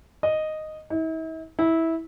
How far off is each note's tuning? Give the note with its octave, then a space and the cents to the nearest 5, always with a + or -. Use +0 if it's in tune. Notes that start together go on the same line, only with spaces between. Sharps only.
D#5 -5
E4 -45
E4 -15